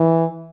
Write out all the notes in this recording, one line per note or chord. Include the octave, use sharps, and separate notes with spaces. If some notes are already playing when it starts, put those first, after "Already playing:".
Already playing: E3